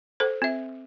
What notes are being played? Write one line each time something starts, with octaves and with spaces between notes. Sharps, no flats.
A4 C5
C4 E5